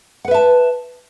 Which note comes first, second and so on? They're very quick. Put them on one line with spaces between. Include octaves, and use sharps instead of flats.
F#5 B4 E5 A5